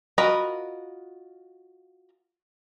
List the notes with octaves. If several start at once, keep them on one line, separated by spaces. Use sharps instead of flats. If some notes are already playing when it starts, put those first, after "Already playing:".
F4 F#4 A#4 D#5 B5